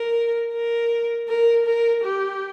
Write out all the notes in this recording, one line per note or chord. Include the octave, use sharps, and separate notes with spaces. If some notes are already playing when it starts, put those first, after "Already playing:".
Already playing: A#4
A#4
A#4
A#4
G4